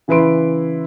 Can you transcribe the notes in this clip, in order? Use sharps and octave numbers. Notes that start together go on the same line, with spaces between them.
C#3 E3 E4 B4 C6 D7